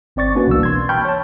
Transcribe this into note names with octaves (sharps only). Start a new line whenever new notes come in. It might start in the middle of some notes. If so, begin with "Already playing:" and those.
G1 C4 D5 C#6 A6
A#3 C#4 D4 F#4 B4
C2 B2 E3 A#3 E6
C6 G#6
G5 A5 B5 C#6 F6 G6
C#5 A5